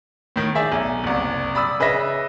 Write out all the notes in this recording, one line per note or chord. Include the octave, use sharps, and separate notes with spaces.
A2 D#3
G#4 D5 E5
B1
F#1 C2
D5 B5 D#6 E6
C#3 B4 D#5 E5 A#6